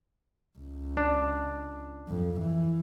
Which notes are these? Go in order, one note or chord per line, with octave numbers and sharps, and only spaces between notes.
C#2
D4
F2
E3